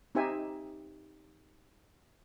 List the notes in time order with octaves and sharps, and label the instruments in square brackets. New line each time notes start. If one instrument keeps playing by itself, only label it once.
[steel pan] C4 D#4 G4 C5 E5 G#5